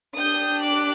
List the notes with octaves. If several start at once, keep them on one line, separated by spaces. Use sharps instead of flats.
D4 G4 D#6 G6
D6 F#6